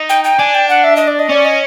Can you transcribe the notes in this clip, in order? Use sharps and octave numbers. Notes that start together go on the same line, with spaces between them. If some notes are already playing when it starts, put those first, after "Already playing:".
Already playing: D#4
G5
G5
D4 G#5
G5
F#5
E5
D#5
D5
D#5
C#4 D5
D#5